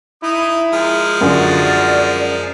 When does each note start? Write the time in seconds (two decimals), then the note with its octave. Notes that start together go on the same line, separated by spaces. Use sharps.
0.23 D#4 E4 D#6
0.73 F3 G#3 A#4
1.21 F#2 D3 F4 F#4 D5